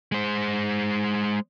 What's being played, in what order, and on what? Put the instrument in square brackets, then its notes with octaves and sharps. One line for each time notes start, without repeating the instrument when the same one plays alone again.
[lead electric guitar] G#3 C5